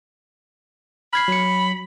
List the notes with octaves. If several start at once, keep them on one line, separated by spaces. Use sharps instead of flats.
B5 F6 G#6 C7
F#3 C#7